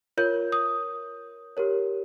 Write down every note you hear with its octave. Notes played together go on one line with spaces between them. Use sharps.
F4 A#4 C#5 G6
D#6
G4 A#4 C#5